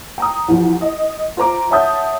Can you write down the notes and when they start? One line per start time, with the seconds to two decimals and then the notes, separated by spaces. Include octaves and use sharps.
0.18 G5 A#5 D#6
0.48 C2 E3 F3
0.81 D#5
1.37 F4 C5 A#5 D6
1.70 C#5 E5 F#5 A5 D#6 G6